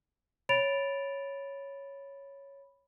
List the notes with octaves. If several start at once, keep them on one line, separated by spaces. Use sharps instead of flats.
C#5 B5 A6 D7 F7